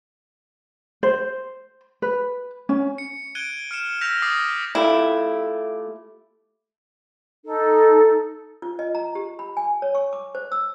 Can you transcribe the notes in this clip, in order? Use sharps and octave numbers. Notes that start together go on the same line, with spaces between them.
C5
B4
C#4
C#7
F#6 G#6 D7 D#7 G7
F6 C#7 E7
E6 F6 G6 A#6 B6 F7
D6 D#6 A6 A#6 C7
A3 E4 F4 G4
D#4 A4
F4
D#5
A#5
G4
B5
G#5
C#5
C#6
D6
C5
E6